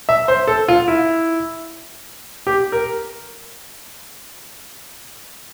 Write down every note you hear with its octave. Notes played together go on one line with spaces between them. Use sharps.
E5
C5
A4
F4
E4
G4
A#4